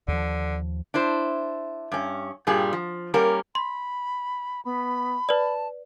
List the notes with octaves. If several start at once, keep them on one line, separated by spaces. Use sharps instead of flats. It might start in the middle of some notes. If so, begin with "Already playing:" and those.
D#2 D3 F3
D4 E4 C5
G2 C#4
G2 A#2 G3 G#4
F3
G3 A#3 C#4 A#4
B5 C6
B3 B5
B4 D5 A5